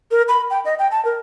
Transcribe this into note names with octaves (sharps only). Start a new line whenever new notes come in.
A#4
B5
G5
D#5
G5
A5
A#4